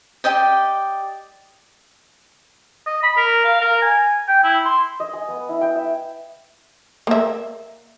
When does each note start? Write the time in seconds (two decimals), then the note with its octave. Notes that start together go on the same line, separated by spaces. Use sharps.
0.24 G4 D5 D#5 G5
2.87 D#5
3.03 B5
3.17 A#4
3.44 F5
3.61 A#4
3.82 G#5
4.28 G5
4.44 E4
4.65 C6
5.00 D#5
5.13 G#5
5.28 B3
5.49 E4
5.61 G5
5.75 E5
7.07 A#3 E5